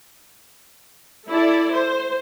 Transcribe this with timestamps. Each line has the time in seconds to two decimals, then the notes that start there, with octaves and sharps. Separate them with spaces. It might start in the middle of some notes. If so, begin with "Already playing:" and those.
1.28 E4 A4 D5
1.72 C5